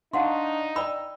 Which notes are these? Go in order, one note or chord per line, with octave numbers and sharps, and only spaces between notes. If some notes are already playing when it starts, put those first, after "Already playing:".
D4 D#4 F5 F#5 C6 C#6
D5 G5 B5 E6